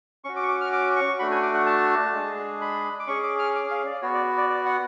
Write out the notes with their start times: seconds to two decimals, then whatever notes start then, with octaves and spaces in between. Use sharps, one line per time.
0.24 C#4 F#4 C#6
0.36 D6
0.43 C#6
0.48 D6
0.61 F6
0.72 D6
0.96 C#6
1.19 A3 D4 F#4 B5
1.31 G#5
1.43 D6
1.54 F#5
1.66 A5
2.13 G#3 D4 G#4
2.61 B5
3.00 D6
3.07 C#4 G#4 C#6
3.23 D6
3.39 F6
3.55 D6
3.71 F5
3.86 D5
4.02 B3 F#4 C#5
4.14 D5
4.37 D5
4.50 D5
4.65 F#5